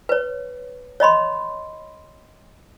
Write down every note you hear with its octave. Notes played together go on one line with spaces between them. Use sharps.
B4 C#5
C#5 D#5 B5 C6